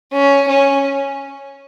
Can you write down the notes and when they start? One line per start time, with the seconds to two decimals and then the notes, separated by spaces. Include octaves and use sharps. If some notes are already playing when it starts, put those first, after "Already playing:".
0.13 C#4
0.48 C#4